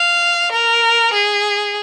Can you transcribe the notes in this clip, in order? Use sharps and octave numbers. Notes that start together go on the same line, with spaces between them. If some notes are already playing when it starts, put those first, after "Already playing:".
Already playing: F5
A#4
G#4